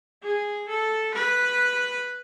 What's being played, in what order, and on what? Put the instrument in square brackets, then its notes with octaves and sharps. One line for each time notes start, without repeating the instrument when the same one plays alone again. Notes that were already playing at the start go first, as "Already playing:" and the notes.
[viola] G#4
A4
B4